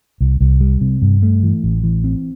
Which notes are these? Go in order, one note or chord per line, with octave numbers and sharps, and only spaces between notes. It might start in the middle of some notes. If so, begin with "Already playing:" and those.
C2
C2
G3
C3
G2
A3
E3
A1
E3
C4